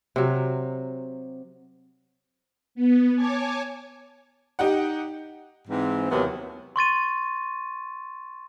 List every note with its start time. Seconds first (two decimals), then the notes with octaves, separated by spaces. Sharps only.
0.16 C3 F#3
2.75 B3
3.16 C#5 G#5 A5 D6 G#6
4.59 D#4 G4 F#5
5.68 G#2 E3 C4
6.10 D#2 C3 E3 F#3 B3
6.76 C6 C#6 A6 D#7